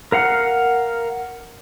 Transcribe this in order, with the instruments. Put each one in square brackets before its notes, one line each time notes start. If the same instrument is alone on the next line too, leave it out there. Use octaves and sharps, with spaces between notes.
[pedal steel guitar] A#4 F5 F#5